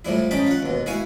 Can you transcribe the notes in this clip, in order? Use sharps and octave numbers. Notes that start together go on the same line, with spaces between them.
A2 F3 G3 E4
C#4 D#4 G5 A5 B5
F4 F#5
D#2 B2
E4 F#4 F5 G#5 C#6